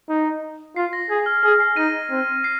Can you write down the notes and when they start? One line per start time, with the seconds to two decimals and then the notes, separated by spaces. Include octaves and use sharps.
0.09 D#4
0.76 F4 C7
0.93 A#6
1.09 G#4 G#6
1.26 F6
1.43 G#4 F6
1.60 C7
1.76 D#4 A#6 D#7
2.10 C4
2.44 C7